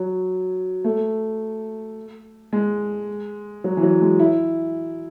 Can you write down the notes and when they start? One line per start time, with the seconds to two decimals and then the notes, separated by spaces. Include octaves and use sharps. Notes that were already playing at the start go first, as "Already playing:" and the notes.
Already playing: F#3
0.84 A3
2.53 G#3
3.64 F#3
3.77 E3
3.83 F#3
4.01 G#3
4.19 E4